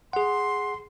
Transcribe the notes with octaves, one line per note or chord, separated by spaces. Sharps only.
G#4 F#5 C6